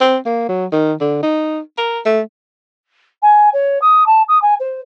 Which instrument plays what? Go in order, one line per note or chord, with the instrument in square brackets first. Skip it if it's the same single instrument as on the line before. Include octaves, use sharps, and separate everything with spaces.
[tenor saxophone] C4
A#3
F#3
D#3
D3
D#4
A#4
A3
[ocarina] G#5
C#5
D#6
A5
D#6
G#5
C5